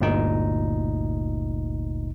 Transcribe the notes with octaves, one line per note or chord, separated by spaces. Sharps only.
G1 D2 A#2 D#4